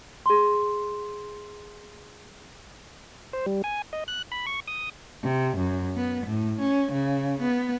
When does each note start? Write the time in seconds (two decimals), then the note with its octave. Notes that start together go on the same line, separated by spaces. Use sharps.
0.26 G#4 C6
3.33 C5
3.46 G3
3.64 G#5
3.93 D#5
4.08 F#6
4.32 B5
4.47 C#6
4.67 D#6
5.23 C3
5.57 F#2
5.96 B3
6.26 A2
6.60 C#4
6.92 C#3
7.41 B3